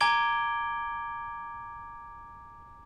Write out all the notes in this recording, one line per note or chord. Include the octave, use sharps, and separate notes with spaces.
G#5 A#5 D6 G#6 D7 G7